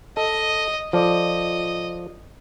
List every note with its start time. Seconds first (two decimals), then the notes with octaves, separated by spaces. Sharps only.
0.17 A4 D#5
0.93 F3 A4 D5 D#5